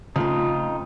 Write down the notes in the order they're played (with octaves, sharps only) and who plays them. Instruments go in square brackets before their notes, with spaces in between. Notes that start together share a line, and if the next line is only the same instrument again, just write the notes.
[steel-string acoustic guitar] F2 [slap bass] C#3 A3 [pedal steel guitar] D#4 F4